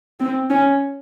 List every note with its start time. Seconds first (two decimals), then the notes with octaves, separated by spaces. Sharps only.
0.20 C4
0.49 C#4